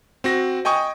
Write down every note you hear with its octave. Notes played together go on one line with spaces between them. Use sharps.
C4 F#4 A#6
D#5 G5 G#5 C#6 D#6